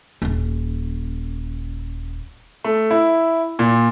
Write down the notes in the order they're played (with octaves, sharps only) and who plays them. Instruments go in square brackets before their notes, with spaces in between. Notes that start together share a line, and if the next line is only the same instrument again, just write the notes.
[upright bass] D#1 C#4
[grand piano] A3
E4
A#2